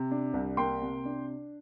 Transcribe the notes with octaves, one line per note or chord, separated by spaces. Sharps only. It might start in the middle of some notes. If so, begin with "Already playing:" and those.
Already playing: C3
D4
C2
A#3 G5 C6
C3
D4